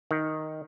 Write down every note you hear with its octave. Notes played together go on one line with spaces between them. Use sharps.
D#3